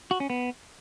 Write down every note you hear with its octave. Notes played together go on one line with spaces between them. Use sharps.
F#4
C#4
B3